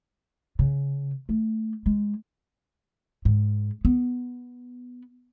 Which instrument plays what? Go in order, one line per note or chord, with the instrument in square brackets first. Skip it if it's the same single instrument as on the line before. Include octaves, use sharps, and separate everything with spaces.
[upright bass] C#3
A3
G#3
G#2
B3